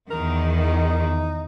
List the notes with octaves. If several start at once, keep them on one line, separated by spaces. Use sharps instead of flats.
E2 D#3 A#4
D#4